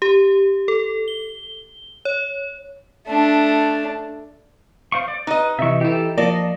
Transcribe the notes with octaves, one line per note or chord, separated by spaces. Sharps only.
G4
A4
G7
C#5
A3 D4
C5 F5 C#6
D5
D#4 B4 D#5
C3 E3 E5 C#6
E3 E4 G4 A4
F3 A#3 D5 D#5 A5